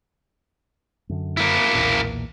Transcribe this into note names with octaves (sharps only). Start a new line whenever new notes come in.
F#2 D3
A#3 E4
B1 E2 A#2